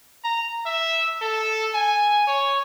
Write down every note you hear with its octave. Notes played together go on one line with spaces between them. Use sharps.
A#5
E5
A4
G#5
C#5